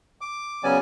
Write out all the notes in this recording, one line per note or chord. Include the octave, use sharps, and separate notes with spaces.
D6
C#3 F#3 B3 C#4 D5 G#5